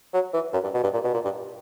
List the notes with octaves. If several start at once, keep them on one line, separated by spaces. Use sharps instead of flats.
F#3
E3
F#2
G2
B2
G2
A#2
B2
A#2
G2